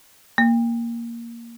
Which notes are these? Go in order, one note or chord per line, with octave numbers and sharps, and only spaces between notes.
A#3